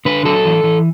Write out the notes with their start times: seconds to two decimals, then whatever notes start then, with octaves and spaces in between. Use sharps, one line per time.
0.05 D3 B4
0.25 F#3 A4
0.45 E3
0.64 E3